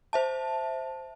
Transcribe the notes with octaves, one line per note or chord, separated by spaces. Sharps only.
C5 E5 A5